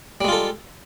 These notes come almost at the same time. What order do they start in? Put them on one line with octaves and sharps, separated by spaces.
G3 G#3 F4 A4